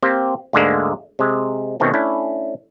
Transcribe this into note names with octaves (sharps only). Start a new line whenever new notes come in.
A#3 C4 G4 C5
D2 G#2 D3 G#3 A#3
C3 G#3
B2 D#3 A3 C4 C#4
A3 C#4 D4 E4